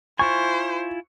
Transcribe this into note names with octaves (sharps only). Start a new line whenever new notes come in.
E4 F4 C5 G#5 C#6